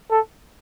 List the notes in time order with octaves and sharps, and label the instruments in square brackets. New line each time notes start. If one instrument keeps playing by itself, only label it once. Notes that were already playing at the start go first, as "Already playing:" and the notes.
[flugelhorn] A4